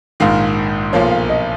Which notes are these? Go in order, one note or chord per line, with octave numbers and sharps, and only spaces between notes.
A#1 G#2 D#3 F5
B1 A#2 F3 A#3 C#5
F5
D#5